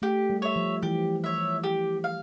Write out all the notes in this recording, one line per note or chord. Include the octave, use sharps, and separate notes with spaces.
A3 G4
G3
C#5 E5
F3
E3 G4
C#5 E5
G4
F5